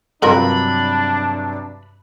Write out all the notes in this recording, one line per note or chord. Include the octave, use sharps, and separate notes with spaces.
G2 C3 F#3 D4 F4 A#4 B4 B5